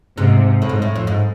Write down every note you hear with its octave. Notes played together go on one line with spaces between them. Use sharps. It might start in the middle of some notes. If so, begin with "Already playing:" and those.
G#2 C3
A2
G#2
A2
F2
G#2